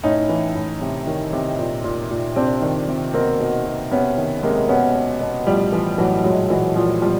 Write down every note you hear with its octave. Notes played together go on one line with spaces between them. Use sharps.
A2 C#4 D#4
E3
A2
C3
D#3
C3
A#2
A#2
A#2
C3 C4 D4
D#3
C3
B2 A#3 C4
B2
B2
C3 B3 C#4
D#3
C3 G#3 A#3
B2 B3 C#4
B2
B2
A2 F3 G3
E3 F3
A2 E3 F#3
A#2 F#3 G#3
A#2 E3 F#3
A#2 F3
B2 F3 G3